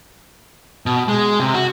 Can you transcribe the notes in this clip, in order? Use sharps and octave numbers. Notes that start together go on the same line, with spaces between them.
B2
G#3
C3
F#4